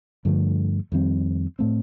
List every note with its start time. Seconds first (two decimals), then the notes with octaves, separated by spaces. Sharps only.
0.25 G2 D3 F3 A3
0.92 F2 D#3 G3 C4
1.59 A2 A3 C4